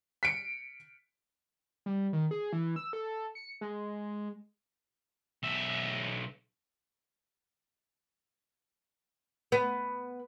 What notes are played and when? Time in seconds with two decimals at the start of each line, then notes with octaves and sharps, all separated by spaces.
0.23 B6 C#7 D7
1.86 G3
2.13 D#3
2.31 G#4
2.53 E3
2.76 E6
2.93 A4
3.35 C#7
3.61 G#3
5.43 B1 E5
9.52 B3